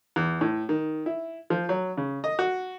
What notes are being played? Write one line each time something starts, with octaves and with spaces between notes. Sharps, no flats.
E2
A2
D#3
E4
F3
F#3
C#3
D#5
F#4